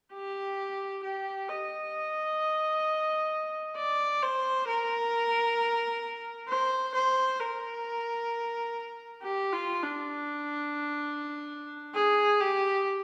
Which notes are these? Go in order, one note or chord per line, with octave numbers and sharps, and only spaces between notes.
G4
G4
D#5
D5
C5
A#4
C5
C5
A#4
G4
F4
D4
G#4
G4